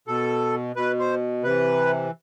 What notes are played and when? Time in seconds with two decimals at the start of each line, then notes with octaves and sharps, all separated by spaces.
0.08 B2 A4
0.76 B2 B4
0.99 C5
1.44 C3 E3 B4